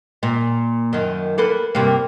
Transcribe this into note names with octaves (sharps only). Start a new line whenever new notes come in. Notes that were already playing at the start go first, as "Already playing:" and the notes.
A#2
F#2 D#3
A#3 A4 B4
G2 C3 A#3